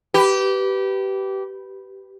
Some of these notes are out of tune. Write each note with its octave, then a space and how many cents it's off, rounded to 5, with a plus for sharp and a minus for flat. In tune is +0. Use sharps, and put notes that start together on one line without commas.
G4 -20 B4 +0